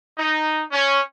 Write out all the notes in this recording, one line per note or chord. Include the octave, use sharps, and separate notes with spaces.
D#4
C#4